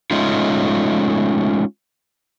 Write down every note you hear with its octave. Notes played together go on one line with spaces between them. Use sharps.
G#3 A3 C#4 D#4 F4